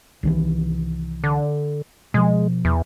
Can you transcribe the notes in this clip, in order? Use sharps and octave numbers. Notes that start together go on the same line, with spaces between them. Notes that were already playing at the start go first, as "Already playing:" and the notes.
C2 D#3 E3
D3
B2 F3 G#3
E2